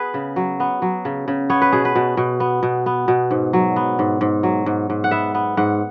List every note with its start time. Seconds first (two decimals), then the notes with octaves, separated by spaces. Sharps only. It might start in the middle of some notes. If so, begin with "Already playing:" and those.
Already playing: B3 G#4 B4
0.14 C#3
0.36 F#3
0.60 B3
0.82 F#3
1.05 C#3
1.28 C#3
1.50 B3 C#5
1.62 B4
1.72 B2 G#4
1.85 B4
1.95 B2
2.17 B2
2.40 B3
2.63 B2
2.86 B3
3.08 B2
3.31 G#2
3.53 F#3
3.76 B3
3.99 G#2
4.21 G#2
4.43 F#3
4.66 G#2
4.90 G#2
5.04 F#5
5.11 B3 E5
5.34 B3
5.57 G#2 F#5